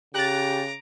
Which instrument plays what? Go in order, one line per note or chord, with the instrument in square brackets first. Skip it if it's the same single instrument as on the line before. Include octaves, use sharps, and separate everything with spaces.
[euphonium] C#3 [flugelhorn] G4 [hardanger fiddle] A#5 D6 [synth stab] F#6 A6